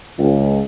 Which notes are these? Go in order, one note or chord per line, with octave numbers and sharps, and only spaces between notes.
C#2